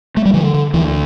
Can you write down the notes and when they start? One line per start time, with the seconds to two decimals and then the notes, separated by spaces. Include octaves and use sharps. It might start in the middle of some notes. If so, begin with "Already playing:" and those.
0.17 A3
0.26 G3
0.33 D3 F3
0.54 D3
0.73 D2 E3